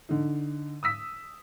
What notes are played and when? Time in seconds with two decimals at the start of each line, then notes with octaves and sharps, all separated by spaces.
0.09 D3 D#4
0.83 D#6 E6 B6